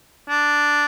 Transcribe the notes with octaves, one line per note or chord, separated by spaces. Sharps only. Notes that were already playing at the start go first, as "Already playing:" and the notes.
D4